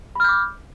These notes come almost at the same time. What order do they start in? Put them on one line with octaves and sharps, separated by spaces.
B5 F6 G6 D6